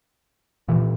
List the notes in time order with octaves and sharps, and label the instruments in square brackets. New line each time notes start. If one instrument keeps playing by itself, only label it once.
[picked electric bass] A#2 E3